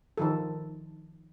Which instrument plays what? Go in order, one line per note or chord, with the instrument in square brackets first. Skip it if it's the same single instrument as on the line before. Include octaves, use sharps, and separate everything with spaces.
[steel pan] D#3 F3 A4